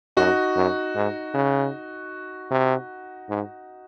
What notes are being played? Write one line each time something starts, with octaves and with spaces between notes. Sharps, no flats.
F#2 D#4 F#4
F#2
G#2
C#3
C3
G#2